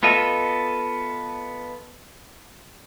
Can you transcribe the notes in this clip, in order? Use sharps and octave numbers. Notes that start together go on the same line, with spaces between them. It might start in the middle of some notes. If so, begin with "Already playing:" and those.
B3 F4 A4 D#5 E5